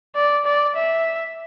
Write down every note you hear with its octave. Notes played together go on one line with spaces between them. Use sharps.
D5
D5
E5